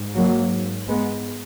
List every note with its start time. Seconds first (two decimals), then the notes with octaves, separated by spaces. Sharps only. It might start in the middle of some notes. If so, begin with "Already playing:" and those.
Already playing: G#2
0.15 F#3 A#3
0.87 G#3 B3